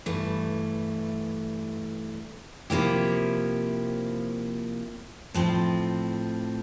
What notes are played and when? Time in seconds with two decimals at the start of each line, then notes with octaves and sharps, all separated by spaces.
0.06 G2 E3 A3
2.70 C3 F3 A#3 E4 G4
5.34 A2 F3 C4